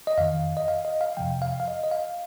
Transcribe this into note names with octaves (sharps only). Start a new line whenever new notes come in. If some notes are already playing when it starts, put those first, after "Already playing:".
D#5
F2 D#3 F5
D#5
F5
D#5
F5
F2 C3 F3 G5
F5
F5
D#5
D#5
F5